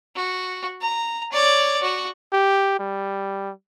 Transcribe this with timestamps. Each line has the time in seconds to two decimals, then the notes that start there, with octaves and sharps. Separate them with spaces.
0.16 F#4
0.81 A#5
1.32 C#5 D5
1.82 F#4
2.33 G4
2.79 G3